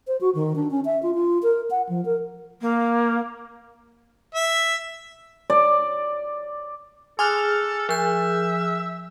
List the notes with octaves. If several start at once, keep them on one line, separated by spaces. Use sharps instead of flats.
C5
F#4
D#3
D4
C#4
E5
F4
F4
A#4
F#5
F3
A#4
A#3
E5
D5
G#4 A4 C6 D6 F6 F#6
F3 E5 G6